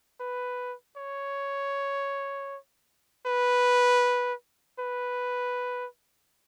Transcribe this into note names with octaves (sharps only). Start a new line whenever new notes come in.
B4
C#5
B4
B4